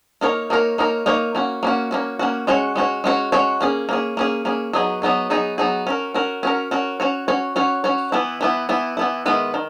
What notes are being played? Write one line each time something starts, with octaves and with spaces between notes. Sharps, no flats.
A#3 D#4 A#4 C#5
A#3 D#4 A#4 C#5
A#3 D#4 A#4 C#5
A#3 D#4 A#4 C#5
A#3 C#4 F#4
A#3 C#4 F#4
A#3 C#4 F#4
A#3 C#4 F#4
G#3 C#4 F#4 C#5
G#3 C#4 F#4 C#5
G#3 C#4 F#4 C#5
G#3 C#4 F#4 C#5
A#3 C#4 G#4
A#3 C#4 G#4
A#3 C#4 G#4
A#3 C#4 G#4
F#3 B3 D#4 G#4
F#3 B3 D#4 G#4
F#3 B3 D#4 G#4
F#3 B3 D#4 G#4
C#4 F#4 A#4
C#4 F#4 A#4
C#4 F#4 A#4
C#4 F#4 A#4
C#4 F#4 C#5
C#4 F#4 C#5
C#4 F#4 C#5
C#4 F#4 C#5
E3 B3 E4
E3 B3 E4
E3 B3 E4
E3 B3 E4
D#3 G#3 B3 E4 B4
D#3